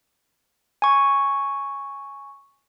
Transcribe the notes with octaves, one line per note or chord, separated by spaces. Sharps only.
G#5 C#6